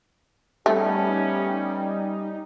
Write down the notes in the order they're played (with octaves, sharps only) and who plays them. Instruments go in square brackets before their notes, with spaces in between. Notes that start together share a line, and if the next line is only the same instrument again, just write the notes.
[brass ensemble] G3 [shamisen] A3 [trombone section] B3 C#4 G4 [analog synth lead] D#4